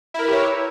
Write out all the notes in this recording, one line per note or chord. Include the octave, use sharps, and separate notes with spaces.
E4 G4 A#4 B4 C#5